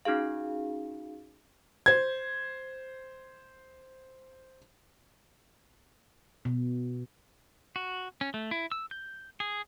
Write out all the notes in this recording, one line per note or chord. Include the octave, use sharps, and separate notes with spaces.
C#4 D#4 F#4 G#4 F5
C5 G#6
B2
F#4
C#4
A3
E4
E6
G6
G#4